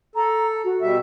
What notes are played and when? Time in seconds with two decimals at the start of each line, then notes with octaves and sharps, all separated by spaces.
0.15 A4 A#5
0.64 F#4
0.82 B2 G3 E5